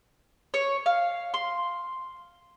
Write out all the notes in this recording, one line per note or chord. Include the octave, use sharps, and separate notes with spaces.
C#5
F5
C6